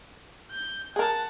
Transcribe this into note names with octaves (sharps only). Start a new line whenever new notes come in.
G6
G#4 A#4 F#5 A5